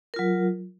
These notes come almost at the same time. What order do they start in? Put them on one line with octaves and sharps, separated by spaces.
A#4 F4 F#3